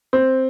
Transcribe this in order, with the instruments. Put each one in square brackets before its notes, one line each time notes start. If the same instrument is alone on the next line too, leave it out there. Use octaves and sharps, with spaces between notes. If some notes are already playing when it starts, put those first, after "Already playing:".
[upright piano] C4